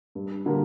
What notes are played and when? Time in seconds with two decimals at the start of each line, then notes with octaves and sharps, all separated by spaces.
0.15 G2
0.46 D3 G3 A#3